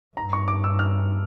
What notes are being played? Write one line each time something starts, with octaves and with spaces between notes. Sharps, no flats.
G2 A#5
C#6
D6
E6
F6